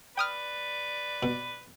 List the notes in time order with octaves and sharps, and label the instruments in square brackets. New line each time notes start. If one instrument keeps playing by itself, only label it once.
[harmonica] B4 D5 [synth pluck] G5 D#6 F6
[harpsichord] B2